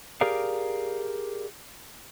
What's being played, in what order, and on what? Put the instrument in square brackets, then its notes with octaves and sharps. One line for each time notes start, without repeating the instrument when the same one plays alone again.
[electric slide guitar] G4 G#4 A#4 D5 F5